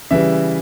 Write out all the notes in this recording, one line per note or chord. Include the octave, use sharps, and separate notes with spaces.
C#3 E3 G3 E5